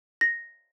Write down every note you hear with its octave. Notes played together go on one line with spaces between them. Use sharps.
A#6